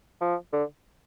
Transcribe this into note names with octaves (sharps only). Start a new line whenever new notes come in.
F3
D3